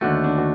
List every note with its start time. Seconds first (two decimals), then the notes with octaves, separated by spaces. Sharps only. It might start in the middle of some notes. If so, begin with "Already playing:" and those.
0.01 D#2 D3 A3 F#4
0.24 D4
0.38 F#4